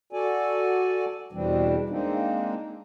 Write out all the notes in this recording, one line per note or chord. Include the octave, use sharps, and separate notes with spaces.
F#4 A4 D5 G#5
E2 B2 E3 G3 C4 D4
G#3 A#3 C4 D4 D#4